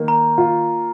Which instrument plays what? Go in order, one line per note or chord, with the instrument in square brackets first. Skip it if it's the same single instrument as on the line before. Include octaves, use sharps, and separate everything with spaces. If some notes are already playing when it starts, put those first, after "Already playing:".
Already playing: [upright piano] D#3 A#3
[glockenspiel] A#5
[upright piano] F4